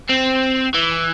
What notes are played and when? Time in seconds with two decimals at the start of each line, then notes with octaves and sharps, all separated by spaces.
0.09 C4
0.74 E3